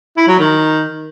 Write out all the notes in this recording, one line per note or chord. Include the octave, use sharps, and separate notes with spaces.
E4
F#3
D#3